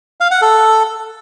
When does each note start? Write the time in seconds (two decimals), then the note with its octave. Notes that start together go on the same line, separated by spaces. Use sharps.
0.21 F5
0.31 F#5
0.42 A4